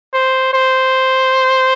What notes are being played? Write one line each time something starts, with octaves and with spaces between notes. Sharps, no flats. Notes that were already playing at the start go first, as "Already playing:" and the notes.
C5
C5